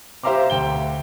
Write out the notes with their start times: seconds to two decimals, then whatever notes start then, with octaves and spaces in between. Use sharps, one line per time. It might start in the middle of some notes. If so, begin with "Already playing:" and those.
0.23 G4 C5 E5 F5 A#5 D6
0.50 D2 G5 G7